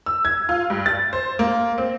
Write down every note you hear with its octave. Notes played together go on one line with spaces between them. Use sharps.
E6
G#6
F4
G2
A6
C5
A#3
C4